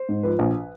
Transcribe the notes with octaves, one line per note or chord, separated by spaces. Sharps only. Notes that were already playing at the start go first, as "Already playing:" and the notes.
Already playing: C5
G#2
F3 B4
A#1